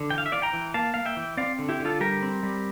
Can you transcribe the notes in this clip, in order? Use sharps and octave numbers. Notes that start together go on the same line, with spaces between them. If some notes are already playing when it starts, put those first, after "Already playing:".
Already playing: D3
E3 G5
F5
E5
E3 D5 F5
G5 A#5
E3
A#3 F5 A5
A#3 F5
E5 G5
E3
C4 D5 F5
D3
E4 G4
D3
F4 A4
G3 G4 A#4
C4
G3